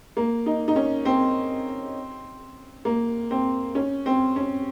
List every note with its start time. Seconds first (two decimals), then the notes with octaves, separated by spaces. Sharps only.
0.17 A#3
0.46 D#4
0.68 D#4
0.76 C#4
1.05 C4
2.85 A#3
3.31 C4
3.75 C#4
4.06 C4
4.36 C#4